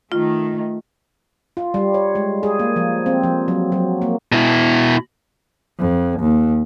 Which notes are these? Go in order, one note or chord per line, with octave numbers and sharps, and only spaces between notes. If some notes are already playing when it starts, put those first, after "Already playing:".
D#3 A3 F4
F4
G3
C#5
G#3
G#4
A#3
F3
C4
F3
F#3
F#3
A#3
B2 E4
F2
D#2